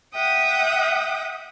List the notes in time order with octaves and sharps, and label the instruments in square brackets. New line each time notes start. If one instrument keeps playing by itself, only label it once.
[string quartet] E5 F#5 G5 D#6